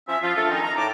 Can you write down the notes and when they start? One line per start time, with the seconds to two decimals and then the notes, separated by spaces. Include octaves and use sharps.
0.08 F3 C#4 E5
0.22 F3 F4
0.36 A3 D4 F4 A4
0.51 D#3 C#4 D#4
0.63 A#5
0.77 A2 D#4 A5 D6